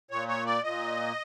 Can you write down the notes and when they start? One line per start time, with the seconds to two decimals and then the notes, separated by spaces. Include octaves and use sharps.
0.11 A#2 C#5
0.28 C#5
0.46 D5
0.63 A#2 D#5